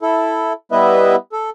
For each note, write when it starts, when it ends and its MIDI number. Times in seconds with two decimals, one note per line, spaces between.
0.02 0.53 64
0.02 0.53 69
0.72 1.16 55
0.72 1.16 59
0.72 1.16 64
0.72 1.16 71
0.72 1.16 75
0.72 1.16 76
1.32 1.50 69